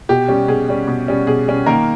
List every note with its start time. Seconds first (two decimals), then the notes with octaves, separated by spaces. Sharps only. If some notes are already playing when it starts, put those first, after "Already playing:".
0.09 B2 G4
0.28 G3 C#4
0.48 B2 G#4
0.69 G3 C#4
0.88 B2
1.08 G3 C#4
1.27 B2 G#4
1.48 G3 C#4
1.66 D#3 A#3 A#4